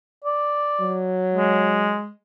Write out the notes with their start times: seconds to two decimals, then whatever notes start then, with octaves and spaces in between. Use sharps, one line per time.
0.24 D5
0.81 F#3
1.35 G#3